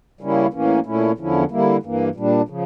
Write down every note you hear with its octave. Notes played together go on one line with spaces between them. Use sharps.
C#3 G3 A#3 C#4 E4
A2 E3 A#3 C#4
A#2 A3 C#4 E4
E2 D3 F3 C#4 E4
D3 G3 A#3 E4
G2 E3 A#3
A#2 G3 D4
C#3 F3